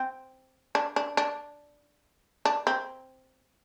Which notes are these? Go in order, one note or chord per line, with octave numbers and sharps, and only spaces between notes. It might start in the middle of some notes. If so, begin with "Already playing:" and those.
Already playing: C4
D4
D4
D4
D4
C4